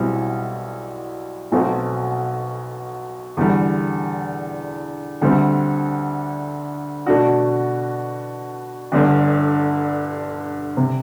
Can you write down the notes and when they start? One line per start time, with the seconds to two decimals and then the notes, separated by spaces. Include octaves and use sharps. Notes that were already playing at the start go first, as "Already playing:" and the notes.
Already playing: B1 B2 G3 C4 E4
1.52 B1 B2 F#3 A3 C4
3.37 E2 D3 G3
5.21 D2 D3 G3 C4
7.06 B2 A3 D4 F#4
8.92 G1 G2 D3
10.77 C3